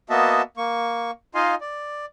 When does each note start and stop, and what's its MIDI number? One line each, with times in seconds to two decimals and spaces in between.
0.10 0.42 58
0.10 0.42 59
0.10 0.42 66
0.10 0.42 75
0.10 0.42 76
0.10 0.42 81
0.57 1.11 58
0.57 1.11 85
1.35 1.55 63
1.35 1.55 65
1.35 1.55 75
1.35 1.55 77
1.35 1.55 80
1.35 1.55 84
1.61 2.06 74